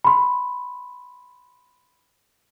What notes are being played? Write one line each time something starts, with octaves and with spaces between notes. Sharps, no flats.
B5 C6